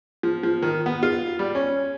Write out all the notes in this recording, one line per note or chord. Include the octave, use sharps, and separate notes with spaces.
F3
F3
D#3
B3
F4
G3
C#4